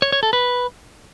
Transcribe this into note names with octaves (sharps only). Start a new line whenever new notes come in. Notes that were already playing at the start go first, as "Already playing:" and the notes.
C#5
C#5
A4
B4